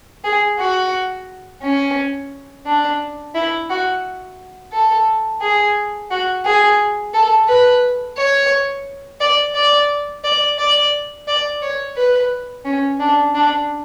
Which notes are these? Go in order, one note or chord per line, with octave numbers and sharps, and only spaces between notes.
G#4
F#4
C#4
D4
E4
F#4
A4
G#4
F#4
G#4
A4
B4
C#5
D5
D5
D5
D5
D5
C#5
B4
C#4
D4
D4